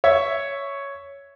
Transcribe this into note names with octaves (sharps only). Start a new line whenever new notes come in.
C#5 E5